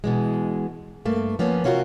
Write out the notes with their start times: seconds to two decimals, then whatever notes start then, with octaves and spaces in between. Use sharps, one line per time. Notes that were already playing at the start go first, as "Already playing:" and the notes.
0.04 B2 E3 G#3
1.05 G2 A3 A#3
1.39 F3 A#3 B3 C#4
1.64 C3 C#4 F4 F#4 A#4